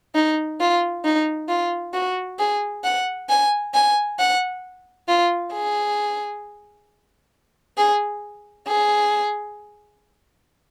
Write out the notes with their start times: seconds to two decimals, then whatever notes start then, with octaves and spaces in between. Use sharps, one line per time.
0.15 D#4
0.60 F4
1.05 D#4
1.49 F4
1.94 F#4
2.39 G#4
2.84 F#5
3.29 G#5
3.74 G#5
4.19 F#5
5.08 F4
5.54 G#4
7.78 G#4
8.67 G#4